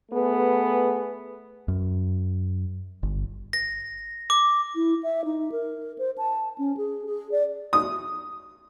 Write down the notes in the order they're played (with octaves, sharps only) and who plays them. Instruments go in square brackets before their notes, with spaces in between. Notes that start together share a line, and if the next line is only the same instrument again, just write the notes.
[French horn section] A3 B3 G#4 B4
[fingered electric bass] F#2
G1
[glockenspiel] A#6
D6
[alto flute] E4
E5
D#4
A#4
C5
A5
C#4
G#4
G#4
D5
[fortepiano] D#6